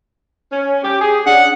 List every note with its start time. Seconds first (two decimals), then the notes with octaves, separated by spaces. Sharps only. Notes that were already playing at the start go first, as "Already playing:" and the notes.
0.52 C#4
0.84 G4
1.00 G#4
1.26 C#4 D4 F#5